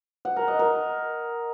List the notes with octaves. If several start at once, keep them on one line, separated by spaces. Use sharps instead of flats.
F#5
A#4
D#5
A#4